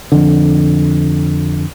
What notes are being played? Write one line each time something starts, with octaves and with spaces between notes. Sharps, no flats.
F2 D3